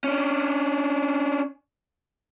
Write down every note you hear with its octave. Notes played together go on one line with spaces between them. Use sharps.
C#4 D4